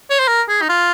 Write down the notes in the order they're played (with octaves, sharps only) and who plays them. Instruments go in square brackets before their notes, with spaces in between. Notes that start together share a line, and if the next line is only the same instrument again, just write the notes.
[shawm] C#5
C5
A#4
G#4
D#4
F4